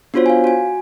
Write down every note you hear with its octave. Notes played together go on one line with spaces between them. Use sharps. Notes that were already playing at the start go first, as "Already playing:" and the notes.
B3 D4 F4 F#4 C5 C#5
F5 G#5
F#4 G#5